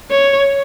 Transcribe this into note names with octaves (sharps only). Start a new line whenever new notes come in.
C#5